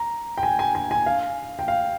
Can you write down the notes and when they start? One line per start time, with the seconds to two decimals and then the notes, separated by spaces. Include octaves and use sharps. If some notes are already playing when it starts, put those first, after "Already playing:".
Already playing: A#5
0.38 G5
0.43 G#5
0.59 G#5
0.75 G#5
0.91 G#5
1.06 F5
1.59 G5
1.68 F5